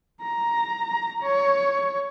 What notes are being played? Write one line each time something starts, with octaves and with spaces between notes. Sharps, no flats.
A#5
C#5